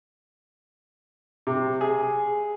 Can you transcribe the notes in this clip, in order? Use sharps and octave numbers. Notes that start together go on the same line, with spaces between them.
C3
G#4